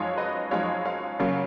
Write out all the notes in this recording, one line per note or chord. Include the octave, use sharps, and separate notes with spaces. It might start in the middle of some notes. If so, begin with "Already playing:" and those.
Already playing: F#2 F3 G#3 D#4 C#5 F5
B4 D#5
F#2 F3 G#3 D#4 C#5 F5
C#5 F5
F#2 C#3 F#3 A#3